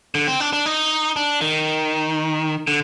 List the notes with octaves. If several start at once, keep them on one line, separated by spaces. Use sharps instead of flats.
D3
C4
D4
D4
D#4
D4
D#3
D3